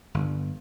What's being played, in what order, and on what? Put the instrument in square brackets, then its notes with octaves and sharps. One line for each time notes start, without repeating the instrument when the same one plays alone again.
[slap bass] G1